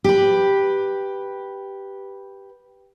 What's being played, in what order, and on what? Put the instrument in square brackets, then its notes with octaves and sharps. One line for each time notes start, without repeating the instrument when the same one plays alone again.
[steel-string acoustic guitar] G4 B4